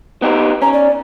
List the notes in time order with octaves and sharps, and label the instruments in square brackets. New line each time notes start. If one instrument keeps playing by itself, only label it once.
[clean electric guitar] B3 D#4 G4
[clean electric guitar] C#4 [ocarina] A#5
[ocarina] D5